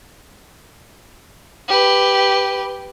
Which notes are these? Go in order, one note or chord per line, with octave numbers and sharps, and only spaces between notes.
G4 B4